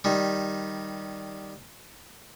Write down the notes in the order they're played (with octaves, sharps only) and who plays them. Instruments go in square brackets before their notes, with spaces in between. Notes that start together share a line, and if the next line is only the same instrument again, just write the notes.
[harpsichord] D#3 G3